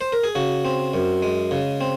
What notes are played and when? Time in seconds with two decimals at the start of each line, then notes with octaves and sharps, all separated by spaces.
0.01 C5
0.12 A#4
0.24 G#4
0.35 C#3 F#4
0.65 C4
0.94 F#2
1.22 G#3
1.51 C#3
1.81 C4